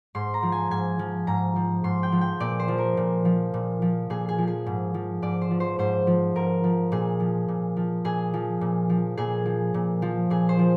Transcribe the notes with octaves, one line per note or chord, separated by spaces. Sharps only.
G#2 C6
A#5
F3
G#5
G#2 G#5
F3
G#2 A#5
F3
G#2 C6
G5
F3
G5
A#2 D5
C5
F3
A#4
A#2
F3
A#2
F3
A#2 G#4
G#4
F3
G#4
G#2
F3
G#2 D5
C5
F3
C5
G#2 C5
F3
G#2 A#4
F3
A#2 G#4
F3
A#2
F3
A#2 G#4
F3
A#2
F3
A#2 G#4
F3
A#2
F3
A#2 G#4
C5
F3